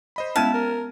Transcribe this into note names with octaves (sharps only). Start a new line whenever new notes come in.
C5 D#5 B5
G#3 B3 C#4 E4 A5 F6 G#6 D#7
A#4